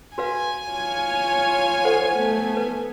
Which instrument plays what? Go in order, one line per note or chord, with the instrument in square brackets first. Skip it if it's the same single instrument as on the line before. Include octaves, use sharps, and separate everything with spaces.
[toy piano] F#4 B4 F5 [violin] G#5
[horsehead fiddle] F4 C#5
[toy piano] A4 C5 F#5
[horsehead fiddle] A3 B3
[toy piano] B4